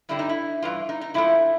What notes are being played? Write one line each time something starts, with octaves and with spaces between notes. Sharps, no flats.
G2 D3 G3 E4
D#4
E4
G2 E3 F4
D#4
D#4
G#2 F3 A3 E4